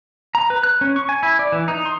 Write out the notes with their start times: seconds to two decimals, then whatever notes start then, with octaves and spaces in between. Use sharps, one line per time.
0.35 A#5
0.50 B4
0.63 F#6
0.81 C#4
0.96 C#6
1.09 G#5
1.23 E4
1.39 D5
1.52 E3
1.68 D#4
1.86 C6